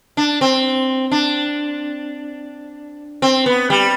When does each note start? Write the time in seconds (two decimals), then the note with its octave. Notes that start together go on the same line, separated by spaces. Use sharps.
0.17 D4
0.41 C4
1.11 D4
3.22 C4
3.46 B3
3.70 G3